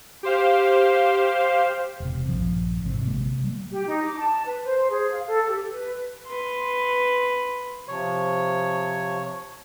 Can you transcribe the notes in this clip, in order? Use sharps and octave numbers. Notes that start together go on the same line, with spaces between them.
G4 C5 F5
E1 C3
A#1 G2 F3
G#1 C3
C3 G#3 A#3
G3 A#3
G4
D#4
D6
A5
B4
C5
G#4
F5
A4
G4
B4
B4 C6
C3 F3 C#5